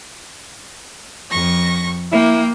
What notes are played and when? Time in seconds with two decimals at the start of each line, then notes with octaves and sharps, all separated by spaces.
1.30 F2 C#6 A#6
2.12 A#3 E4 G5